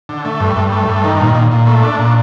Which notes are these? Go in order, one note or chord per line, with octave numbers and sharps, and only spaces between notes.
D3
A3
G2
G2
A3
G2
D#3
A#2
A#2
A#2
A3
D4
A#2